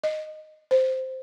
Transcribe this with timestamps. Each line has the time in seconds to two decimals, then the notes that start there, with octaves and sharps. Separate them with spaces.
0.04 D#5
0.71 C5